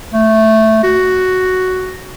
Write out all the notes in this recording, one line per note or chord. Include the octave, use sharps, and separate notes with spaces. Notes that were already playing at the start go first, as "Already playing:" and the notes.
A3
F#4